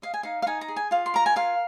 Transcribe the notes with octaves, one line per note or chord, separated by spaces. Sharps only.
D#5 F5
G#5
D#4 F5
F5
D#4 G#5
A#5
G#4
G#5
F4 F5
C6
A#4 A#5
G#5
F4 F5